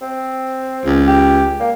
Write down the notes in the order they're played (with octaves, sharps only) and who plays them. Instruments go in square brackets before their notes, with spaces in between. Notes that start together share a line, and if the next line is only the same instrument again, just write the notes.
[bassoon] C4
[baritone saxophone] C#2
[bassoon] G4
A#3